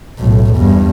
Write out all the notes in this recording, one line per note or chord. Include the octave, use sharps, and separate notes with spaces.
B1 A2
E2 G2